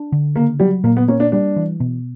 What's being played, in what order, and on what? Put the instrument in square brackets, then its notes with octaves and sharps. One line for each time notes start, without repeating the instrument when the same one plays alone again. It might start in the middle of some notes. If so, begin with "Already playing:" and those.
Already playing: [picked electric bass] D4
D3
[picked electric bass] C#3 [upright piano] A#3
[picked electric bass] F#3 [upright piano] G3
[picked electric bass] A#2 [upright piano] A#3
[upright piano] B3
[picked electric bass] A#3 [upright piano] C#4
[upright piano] D4
[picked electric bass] G3 [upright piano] D4
[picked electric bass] E3
B2